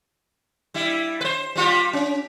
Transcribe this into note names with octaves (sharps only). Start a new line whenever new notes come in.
G3 E4
B4 C5
G3 F4 G4
C#4